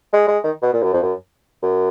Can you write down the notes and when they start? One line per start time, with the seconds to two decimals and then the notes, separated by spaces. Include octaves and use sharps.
0.13 G#3
0.28 G#3
0.44 D#3
0.62 B2
0.73 A#2
0.83 F#2
0.93 F2
1.03 F#2
1.63 F#2